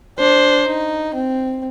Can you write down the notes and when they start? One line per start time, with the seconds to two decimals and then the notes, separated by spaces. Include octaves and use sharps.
0.19 D4 C5
0.67 D#4
1.14 C4